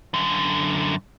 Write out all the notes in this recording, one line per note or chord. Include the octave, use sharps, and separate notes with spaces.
F#2 D3